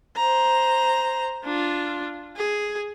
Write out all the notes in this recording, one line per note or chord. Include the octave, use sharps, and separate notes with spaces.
C5 A#5
D4 F4
G#4